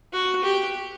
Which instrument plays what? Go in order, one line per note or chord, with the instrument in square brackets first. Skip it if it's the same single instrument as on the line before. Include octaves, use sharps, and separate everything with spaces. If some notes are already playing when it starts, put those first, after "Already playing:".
[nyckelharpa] F#4
G4